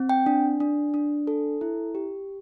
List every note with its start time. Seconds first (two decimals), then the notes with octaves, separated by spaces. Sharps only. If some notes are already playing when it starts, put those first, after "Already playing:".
Already playing: C4
0.09 G5
0.26 D4
0.60 D4
0.94 D4
1.27 A4
1.61 E4
1.95 G4